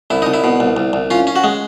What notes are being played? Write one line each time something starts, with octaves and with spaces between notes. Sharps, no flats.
C2 E4
C2 D#4
E4
B2
C2
C2
C2
C#4 F4
C#4
F#4
G#3